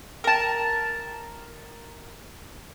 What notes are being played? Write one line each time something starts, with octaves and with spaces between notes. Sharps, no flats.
A#4 A5